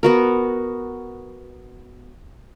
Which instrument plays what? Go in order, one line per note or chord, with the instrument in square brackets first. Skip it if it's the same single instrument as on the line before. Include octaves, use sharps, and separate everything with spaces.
[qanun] B3 F#4 A#4